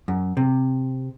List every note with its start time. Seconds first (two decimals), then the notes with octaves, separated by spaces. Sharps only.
0.08 F#2
0.37 C3